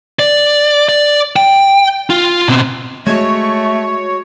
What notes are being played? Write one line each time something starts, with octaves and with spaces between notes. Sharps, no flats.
D5
D5
G5
F4
B2 C4
G#3 A3 F#4 C#5